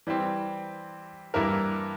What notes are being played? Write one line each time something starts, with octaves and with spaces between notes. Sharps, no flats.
E3 G3 C4
G2 E3 A#3 E4 A#4